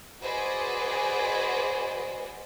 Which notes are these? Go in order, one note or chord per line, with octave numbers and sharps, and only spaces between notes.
F#4 G#4 B4 C5 D5 D#5